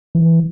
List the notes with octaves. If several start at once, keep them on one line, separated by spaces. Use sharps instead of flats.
E3